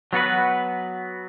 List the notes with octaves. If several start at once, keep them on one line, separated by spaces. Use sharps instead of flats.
F#3 B3 F#4 B4